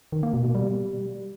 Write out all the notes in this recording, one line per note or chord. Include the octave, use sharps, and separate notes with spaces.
D#3
A#3
B2
B2
G3